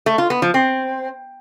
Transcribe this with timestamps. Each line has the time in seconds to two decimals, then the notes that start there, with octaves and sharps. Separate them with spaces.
0.06 A3
0.18 F4
0.30 B3
0.42 F3
0.54 C4